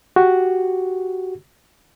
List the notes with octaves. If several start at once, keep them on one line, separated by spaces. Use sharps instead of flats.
F#4 G4